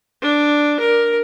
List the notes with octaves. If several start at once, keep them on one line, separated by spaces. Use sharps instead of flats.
D4
A#4